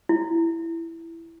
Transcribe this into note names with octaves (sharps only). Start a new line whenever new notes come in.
E4